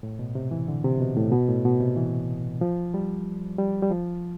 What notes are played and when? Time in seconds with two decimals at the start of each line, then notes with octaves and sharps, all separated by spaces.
0.03 A2
0.19 B2
0.35 C3
0.51 E3
0.68 D3
0.84 C3
1.00 B2
1.16 A2
1.32 B2
1.49 A2
1.65 B2
1.80 C3
1.97 E3
2.61 F3
2.94 G3
3.58 G3
3.82 G3
3.91 F3